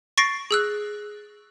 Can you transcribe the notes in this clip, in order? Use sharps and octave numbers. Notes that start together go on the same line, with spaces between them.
C#6 A6 A#6 C7 D7
G#4 E6 F#6